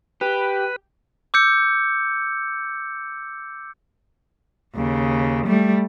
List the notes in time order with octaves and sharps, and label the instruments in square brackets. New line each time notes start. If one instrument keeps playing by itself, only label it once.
[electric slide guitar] G4 [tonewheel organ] B4
[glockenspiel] D6 E6 G6 C#7
[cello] D#2 C#3
G3 A3